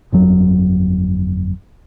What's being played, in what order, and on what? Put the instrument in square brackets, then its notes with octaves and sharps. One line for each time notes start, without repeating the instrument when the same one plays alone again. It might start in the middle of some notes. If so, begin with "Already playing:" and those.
[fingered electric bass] G1 F2 F#3